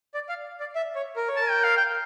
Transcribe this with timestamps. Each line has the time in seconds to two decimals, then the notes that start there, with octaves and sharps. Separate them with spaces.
0.14 D5
0.29 F5
0.60 D5
0.75 E5
0.96 C#5
1.16 A#4
1.28 C#5
1.37 A#4 A5
1.50 G5
1.64 F5
1.77 G5